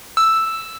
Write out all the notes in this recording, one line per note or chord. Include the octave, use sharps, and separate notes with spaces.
E6